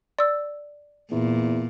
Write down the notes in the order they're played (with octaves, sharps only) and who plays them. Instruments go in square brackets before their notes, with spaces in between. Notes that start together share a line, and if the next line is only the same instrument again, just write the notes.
[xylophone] D5 E6
[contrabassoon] E2 [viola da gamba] A#2